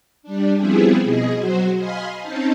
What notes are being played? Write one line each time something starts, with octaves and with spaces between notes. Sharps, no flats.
G3 D4
F3 G3 B3 C4 E4 G#4
B2 G#4 D#5
F#3 F#4 C5
D#5 F5 G#5 B5 C6
C4 C#4 D#4 C5 A5